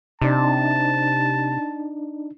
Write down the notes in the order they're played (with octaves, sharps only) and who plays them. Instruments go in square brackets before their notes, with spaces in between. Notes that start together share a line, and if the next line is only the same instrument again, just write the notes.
[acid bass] C3 [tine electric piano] D4 D#4 [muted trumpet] A5